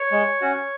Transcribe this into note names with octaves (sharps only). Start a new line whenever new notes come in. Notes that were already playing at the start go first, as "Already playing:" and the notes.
Already playing: C#5
G#3
C#4 F#4